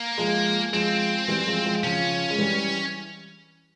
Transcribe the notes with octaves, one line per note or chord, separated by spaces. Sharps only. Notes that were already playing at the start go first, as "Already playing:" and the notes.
Already playing: A#3
F3 G#3
F3 G#3 C4
E3 G3
F3 G#3
F3 G#3
C#3 F3 C#4
G#3
E3 G3